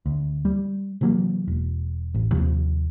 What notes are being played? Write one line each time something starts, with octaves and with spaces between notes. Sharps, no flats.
D2
G3
C3 E3 F#3 A#3
E1
A1
D#2 C3 F3